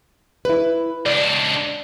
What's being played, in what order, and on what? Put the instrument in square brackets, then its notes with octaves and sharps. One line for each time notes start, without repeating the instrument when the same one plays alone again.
[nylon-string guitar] E4 B4
[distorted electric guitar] C#2 D4 [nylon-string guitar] D5